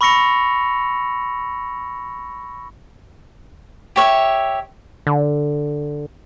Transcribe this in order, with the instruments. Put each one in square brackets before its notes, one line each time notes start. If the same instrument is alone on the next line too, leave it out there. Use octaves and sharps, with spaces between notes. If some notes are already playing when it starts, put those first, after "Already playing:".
[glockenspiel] B5 C#6 E6 A#6 C#7 F7
[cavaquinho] G4 C#5 E5
[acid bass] D3